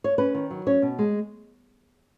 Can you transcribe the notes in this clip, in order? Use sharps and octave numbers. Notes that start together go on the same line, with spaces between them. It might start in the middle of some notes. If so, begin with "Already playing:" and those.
C#5
C#4 B4
D#3
F#3
C#4 C#5
B2
G#3